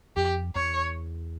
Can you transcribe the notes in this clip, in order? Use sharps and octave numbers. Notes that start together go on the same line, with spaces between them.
F2 G4
E2 C#5